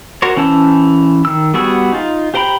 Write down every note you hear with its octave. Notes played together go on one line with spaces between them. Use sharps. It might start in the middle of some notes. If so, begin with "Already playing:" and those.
F#4 A#4 C5 C#5
E3 C#4 C5 A5 E6
D#3 E6
G3 B3 F#4 G#4 E6
D#4 F4
G4 C5 G5 A#5 B5